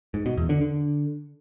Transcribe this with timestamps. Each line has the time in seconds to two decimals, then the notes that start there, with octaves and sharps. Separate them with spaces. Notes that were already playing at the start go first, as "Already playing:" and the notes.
0.14 G#2
0.26 B2
0.37 E2
0.49 D3
0.61 D3